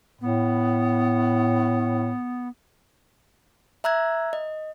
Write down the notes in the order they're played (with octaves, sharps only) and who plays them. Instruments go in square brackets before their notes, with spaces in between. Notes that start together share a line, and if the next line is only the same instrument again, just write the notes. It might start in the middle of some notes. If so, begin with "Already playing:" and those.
[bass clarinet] A2 [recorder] B3
[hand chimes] E5 A#5 E6 F#6 G#6
D#5